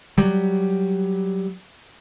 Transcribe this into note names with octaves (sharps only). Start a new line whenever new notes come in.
F#3 G3